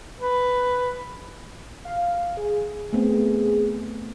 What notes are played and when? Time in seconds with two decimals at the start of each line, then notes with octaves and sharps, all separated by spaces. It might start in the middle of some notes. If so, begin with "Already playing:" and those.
0.20 B4
1.85 F5
2.01 F5
2.37 G#4
2.93 A3 B3 C4